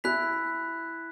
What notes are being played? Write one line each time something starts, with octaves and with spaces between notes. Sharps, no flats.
E4 G#5 F#6 B6 F7